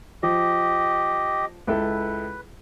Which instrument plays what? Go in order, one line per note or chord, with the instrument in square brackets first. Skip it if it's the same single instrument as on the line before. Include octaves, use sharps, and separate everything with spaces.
[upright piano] F3 [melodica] G4 D#5
[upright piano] C#2 E4 A4 [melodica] B4